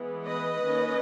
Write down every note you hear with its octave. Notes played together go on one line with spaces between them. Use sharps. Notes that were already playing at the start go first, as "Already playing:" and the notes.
Already playing: E3 G#3 B3
B4 D#5
D#3 A#3 C#4